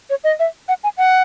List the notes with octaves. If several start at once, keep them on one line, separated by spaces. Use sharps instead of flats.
C#5
D#5
E5
F#5
G#5
F#5